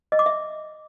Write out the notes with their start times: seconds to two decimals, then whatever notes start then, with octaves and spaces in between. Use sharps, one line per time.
0.12 D#5
0.19 D6
0.26 E5